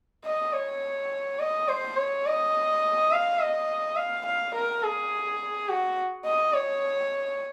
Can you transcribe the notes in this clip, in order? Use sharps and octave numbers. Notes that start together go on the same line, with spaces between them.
D#5
C#5
D#5
C5
C#5
D#5
F5
D#5
F5
F5
A#4
G#4
F#4
D#5
C#5